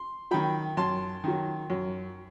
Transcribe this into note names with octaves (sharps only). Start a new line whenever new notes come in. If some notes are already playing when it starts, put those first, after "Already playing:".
Already playing: C6
D#3 F#3 G5 B5
F#2 A5 C6
D#3 F#3
F#2